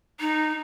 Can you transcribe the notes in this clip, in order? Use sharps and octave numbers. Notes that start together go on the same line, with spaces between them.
D#4